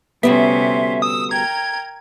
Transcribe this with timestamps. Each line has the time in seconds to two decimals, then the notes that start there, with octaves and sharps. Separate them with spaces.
0.23 D2 C3 G3 B3 C#4 E5 C6
1.02 D#6 E6
1.31 A#4 G5 A#5 G#6